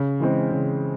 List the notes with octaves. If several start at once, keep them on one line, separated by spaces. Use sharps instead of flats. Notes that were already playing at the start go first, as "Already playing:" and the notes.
Already playing: C#3
E3 G#3 C4
C#3